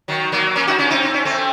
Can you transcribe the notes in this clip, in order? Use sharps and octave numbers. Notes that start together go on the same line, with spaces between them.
D#3 F#3
F#3 A#3
A#3 C#4
D#4 F#4
C#4 F4
C4 D#4
C4
C#4
A3 C4